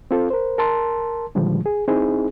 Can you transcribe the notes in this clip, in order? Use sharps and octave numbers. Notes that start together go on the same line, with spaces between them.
C4 F4 A4
A#4 C5
A#4 A5 C6
A#2 D3 D#3 F3 G3 G#3
G#4
C4 D#4 E4 G#4